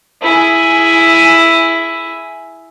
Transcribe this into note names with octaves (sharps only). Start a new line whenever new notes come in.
E4 G#4